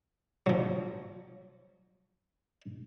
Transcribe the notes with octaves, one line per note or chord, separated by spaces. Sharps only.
F3 F#3